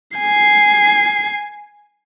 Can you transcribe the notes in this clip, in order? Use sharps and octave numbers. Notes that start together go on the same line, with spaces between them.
G#5 C7